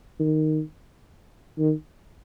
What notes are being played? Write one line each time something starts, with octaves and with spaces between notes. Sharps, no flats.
D#3
D#3